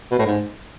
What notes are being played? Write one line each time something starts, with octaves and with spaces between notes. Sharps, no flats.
B2
A2
G#2